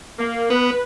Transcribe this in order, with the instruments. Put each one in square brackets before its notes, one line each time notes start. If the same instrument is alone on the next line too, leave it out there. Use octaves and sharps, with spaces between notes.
[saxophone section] A#3
[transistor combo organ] B3 [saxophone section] B4